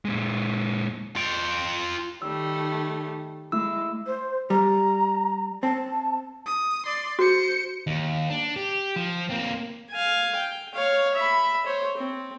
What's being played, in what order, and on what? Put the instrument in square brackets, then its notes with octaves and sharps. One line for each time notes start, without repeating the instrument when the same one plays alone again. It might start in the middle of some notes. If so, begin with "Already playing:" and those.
[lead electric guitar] A#2 G#3
[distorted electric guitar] F4 G5
[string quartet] D#3 G3 A3 [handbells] E6
[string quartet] G#3 [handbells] A3 E4 E6
[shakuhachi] C5
[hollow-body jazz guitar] G3 [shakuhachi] A#5
[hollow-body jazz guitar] C4 [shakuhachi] A5
[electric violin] D#6
D5 C6
[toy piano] F#4 [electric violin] C5 C#7
[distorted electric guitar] D#2
D4
G4
F3
A#3 C4
[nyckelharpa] F5 G#5
G5
C#5 F5
E5 B5
C5 C#5
C4